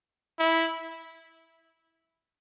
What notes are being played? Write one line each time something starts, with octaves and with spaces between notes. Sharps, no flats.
E4